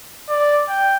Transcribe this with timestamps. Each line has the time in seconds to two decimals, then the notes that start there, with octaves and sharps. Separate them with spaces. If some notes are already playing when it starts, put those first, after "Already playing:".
0.29 D5
0.69 G5